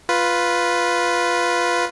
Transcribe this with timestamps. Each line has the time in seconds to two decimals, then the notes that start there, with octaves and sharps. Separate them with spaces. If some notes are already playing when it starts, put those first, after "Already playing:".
0.09 F4 B4